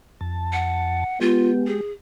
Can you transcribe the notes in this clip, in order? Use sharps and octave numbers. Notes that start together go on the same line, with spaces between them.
F2 A5
F#5
G#3 B3 F4 G4
G#4